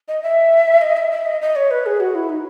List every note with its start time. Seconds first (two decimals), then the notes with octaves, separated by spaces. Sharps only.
0.08 D#5
0.23 E5
0.81 D#5
0.97 E5
1.11 E5
1.26 D#5
1.42 D#5
1.56 C#5
1.71 B4
1.86 G#4
2.00 F#4
2.15 E4
2.29 D#4